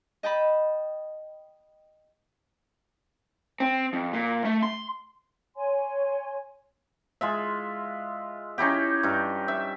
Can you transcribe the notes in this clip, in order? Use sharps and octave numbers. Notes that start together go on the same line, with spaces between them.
D#5 G5 A5 B5
C4
F2
A#2
A3
C6
C#5 G#5 C6
G#3 F4 E5
C#4 D#4 E4 G4
G2 D#4
E5